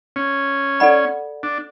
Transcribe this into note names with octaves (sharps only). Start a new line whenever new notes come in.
C#4
A4 D5 F#5 B5
D4